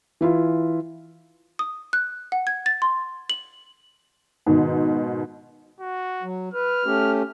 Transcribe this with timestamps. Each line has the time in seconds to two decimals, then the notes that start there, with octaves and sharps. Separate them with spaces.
0.21 E3 E4 F4
1.59 D#6
1.93 F#6
2.32 F#5
2.47 G#6
2.66 A6
2.82 C6
3.30 F#7
4.46 G#2 B2 D#3
5.81 F#4
6.23 F#3
6.54 B4 F6
6.85 A3 C#4 G4